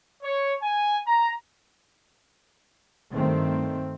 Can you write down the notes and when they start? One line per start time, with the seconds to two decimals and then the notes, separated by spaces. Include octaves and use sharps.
0.23 C#5
0.61 G#5
1.05 A#5
3.13 G2 D#3 A3 C4